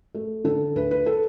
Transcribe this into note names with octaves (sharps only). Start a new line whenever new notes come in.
A3
D3 A4
D2 B4
B4
A4